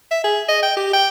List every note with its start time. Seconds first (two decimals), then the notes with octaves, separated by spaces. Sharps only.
0.11 E5
0.24 G#4
0.48 D#5
0.63 G5
0.77 G4
0.93 G5